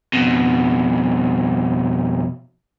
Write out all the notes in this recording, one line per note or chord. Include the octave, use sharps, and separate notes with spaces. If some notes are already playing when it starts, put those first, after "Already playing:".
F2 B2